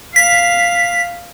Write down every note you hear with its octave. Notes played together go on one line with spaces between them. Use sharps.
F5 B6